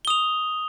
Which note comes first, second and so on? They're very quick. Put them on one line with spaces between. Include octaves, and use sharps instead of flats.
G7 D#6 F7